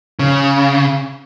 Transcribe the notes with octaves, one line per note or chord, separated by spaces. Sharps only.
C#3